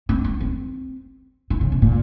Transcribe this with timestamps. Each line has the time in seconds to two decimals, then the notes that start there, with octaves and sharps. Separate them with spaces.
0.09 C4
0.24 C4
0.40 C4
1.50 E3
1.61 C#3
1.72 C3
1.82 A#2